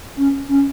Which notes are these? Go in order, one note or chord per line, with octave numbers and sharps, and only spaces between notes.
C#4
C#4